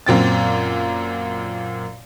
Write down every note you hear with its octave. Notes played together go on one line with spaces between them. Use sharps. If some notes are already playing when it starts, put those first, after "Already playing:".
F#2 A#2 C4 A6